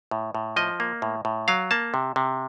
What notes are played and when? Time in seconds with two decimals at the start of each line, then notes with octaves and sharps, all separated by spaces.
0.11 A2
0.35 A2
0.56 F3 D#5
0.80 A#3
1.02 A2
1.25 A2
1.48 F#3 F5
1.71 A#3 A5
1.94 C3
2.16 C3